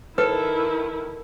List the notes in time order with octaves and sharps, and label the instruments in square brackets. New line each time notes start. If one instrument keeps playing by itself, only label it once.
[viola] D#3 E4 [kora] A4 [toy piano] B4